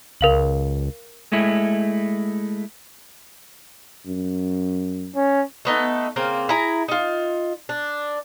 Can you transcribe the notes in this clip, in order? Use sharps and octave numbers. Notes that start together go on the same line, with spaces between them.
C#2 A#4 F5 F#7
G#3 A3 E4
F#2
C#4
A3 B3 D#4 A4
C#3 A#3 C4
E4 G#4 A#5
D#4 F4
D4